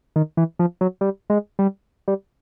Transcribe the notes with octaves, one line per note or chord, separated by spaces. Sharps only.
D#3
E3
F3
F#3
G3
G#3
G3
G3